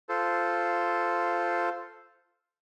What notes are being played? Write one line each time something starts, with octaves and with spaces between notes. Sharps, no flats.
F4 A4 C5